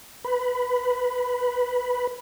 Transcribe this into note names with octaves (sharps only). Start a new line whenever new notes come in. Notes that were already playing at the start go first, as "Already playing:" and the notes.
B4 B5